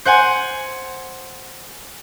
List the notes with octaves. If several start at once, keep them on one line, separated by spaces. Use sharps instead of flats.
C5 F#5 G#5 C6